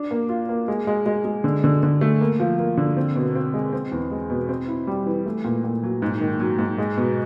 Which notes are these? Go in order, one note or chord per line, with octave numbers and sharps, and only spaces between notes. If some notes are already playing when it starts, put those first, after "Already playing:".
Already playing: D4
A#3
F4
A#3
G#3
G#3
G#3
G#3
D3
D3
D3
A3
A#3
F3
A#3
D3
C4
B2
C4
G#3
C4
E2
G#3
B2
C4
E4
G3
E3
A3
A#2
A#2
F#3
G#2
D#3
F#3
G#2
G#3
B2